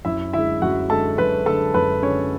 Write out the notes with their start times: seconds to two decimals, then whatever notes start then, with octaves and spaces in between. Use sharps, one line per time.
0.05 F#2 E4 E5
0.33 D3 G#3 E4 E5
0.62 F#2 F#4 F#5
0.90 D3 G#3 A4 A5
1.18 F#2 B4 B5
1.46 D3 G#3 A4 A5
1.74 F#2 B4 B5
2.02 D3 G#3 C#4 C#5